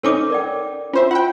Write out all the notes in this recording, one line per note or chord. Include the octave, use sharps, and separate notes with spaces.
C4 C#4 D#4 A4 D6 D#6
A#4 D5 G5
C#4 F4 C5 E5
F4 F#5 G5